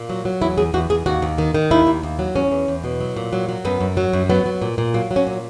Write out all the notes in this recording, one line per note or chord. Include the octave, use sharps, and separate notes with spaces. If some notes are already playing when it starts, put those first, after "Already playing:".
Already playing: A#2
F#3
F#3
E2 E4
E2 G#4
E2 F#4
E2 G#4
D#2 F#4
D#2
D#3
D#3
D#2 E4
D#2
D#2
F#3
E2 C#4
E2
E2
B2
F#3
A#2
F#3
F#3
F#2 B3
F#2
F#3
F#2
F#3 B3
F#3
A#2
A#2
F#3 A#3
F#3
C#4
A#2